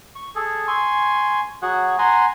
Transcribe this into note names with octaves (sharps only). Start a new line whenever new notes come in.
C#6
G#4 A4
G#5 C6 C#6
F#3 F#4 G#4 F#5
F#5 G#5 A#5 C6